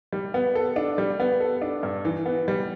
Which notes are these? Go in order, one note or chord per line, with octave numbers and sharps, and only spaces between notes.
G3
B3
A4
D4
G3
B3
A4
D4
G2
E3
B3
G3